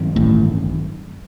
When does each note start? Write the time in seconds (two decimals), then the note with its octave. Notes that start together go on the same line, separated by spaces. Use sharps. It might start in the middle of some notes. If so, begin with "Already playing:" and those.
Already playing: G2 D#3 F#3 C4
0.16 A1 A2